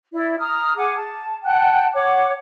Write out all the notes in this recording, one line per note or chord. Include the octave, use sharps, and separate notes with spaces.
E4 D5
A#5 D#6 F6
G#4 F#5 G#5 D6
A5
F#5 G5 A5 F#6
C#5 F#5 D6